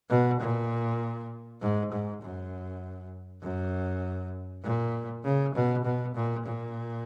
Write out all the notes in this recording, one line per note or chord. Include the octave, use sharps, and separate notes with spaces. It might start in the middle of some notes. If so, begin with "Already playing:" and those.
B2
A#2
G#2
G#2
F#2
F#2
A#2
C#3
B2
B2
A#2
A#2